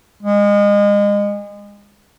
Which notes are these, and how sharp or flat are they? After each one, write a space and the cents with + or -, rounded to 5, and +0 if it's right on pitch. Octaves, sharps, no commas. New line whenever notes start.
G#3 -30